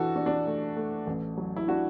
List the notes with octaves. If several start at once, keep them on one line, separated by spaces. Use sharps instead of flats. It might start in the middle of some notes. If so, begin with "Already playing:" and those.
Already playing: E3 D4 F#4 A4
D4
D4
A3
A3
A1
F#3
E4
D4 F#4